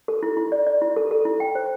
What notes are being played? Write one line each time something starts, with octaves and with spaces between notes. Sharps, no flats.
A4
E4
E4
D5
D5
E4
A4
A4
E4
G5
C5